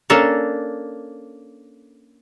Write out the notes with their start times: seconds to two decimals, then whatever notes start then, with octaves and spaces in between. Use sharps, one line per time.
0.10 A#3 C#4 D4 A4 A#4